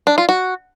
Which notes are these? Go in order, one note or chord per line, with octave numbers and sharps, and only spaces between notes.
D4
F4
F#4